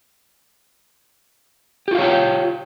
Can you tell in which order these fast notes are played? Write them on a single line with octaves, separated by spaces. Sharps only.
G4 F4 F5 C#5 G5